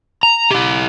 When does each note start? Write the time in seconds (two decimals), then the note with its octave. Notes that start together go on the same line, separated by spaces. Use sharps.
0.23 A#5
0.51 E4 G4